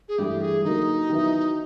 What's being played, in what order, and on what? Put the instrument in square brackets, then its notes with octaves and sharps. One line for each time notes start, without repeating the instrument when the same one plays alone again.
[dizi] G#4
[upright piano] G2 E3 A3 [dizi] G4
[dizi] G#4
[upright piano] D3 F#3 A#3 [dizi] D#4
[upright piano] D#3 F#3 B3 E4